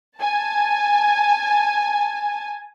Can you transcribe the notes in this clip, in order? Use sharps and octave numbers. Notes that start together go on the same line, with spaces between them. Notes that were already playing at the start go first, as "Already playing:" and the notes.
G#5 A5